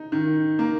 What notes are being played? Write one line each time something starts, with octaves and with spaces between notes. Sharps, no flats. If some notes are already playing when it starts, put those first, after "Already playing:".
Already playing: D#4
D#3
A#3